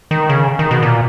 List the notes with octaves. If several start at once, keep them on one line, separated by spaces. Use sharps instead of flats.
D#3
C#3
D#3
B2
A#2